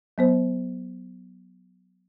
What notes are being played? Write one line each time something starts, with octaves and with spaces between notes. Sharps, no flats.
F#3 B3 C5